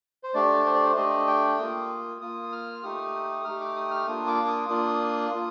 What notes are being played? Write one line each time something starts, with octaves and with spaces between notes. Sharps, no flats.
C5
A3 D4 G4 D5
C5
D5
C5
A3 D4 G4 D#5
G5
A#3 F4 D#6
A#3 F4 D#6
F6
A3 D#4 G4 D#6
A3 D#4 G4 F6
D6
D#6
F6
A#3 D4 F4 D#6
D6
D#6
A#3 D4 F4 D#6
A#3 F4